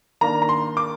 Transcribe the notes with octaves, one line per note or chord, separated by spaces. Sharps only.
D#3 A#3 D4 A#5
A#5
C6
D6